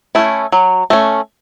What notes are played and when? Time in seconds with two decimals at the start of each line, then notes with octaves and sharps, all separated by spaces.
0.15 A3 C#4 E4
0.52 F#3
0.90 A3 C#4